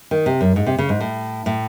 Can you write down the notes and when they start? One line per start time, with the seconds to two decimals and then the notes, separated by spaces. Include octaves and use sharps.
0.11 D#3
0.26 C3
0.41 F#2
0.56 G#2
0.66 C3
0.79 C#3
0.89 G#2
1.01 A2
1.46 A2